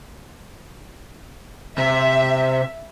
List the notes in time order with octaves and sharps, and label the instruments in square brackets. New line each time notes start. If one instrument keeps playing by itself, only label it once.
[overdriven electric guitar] C3 [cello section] E5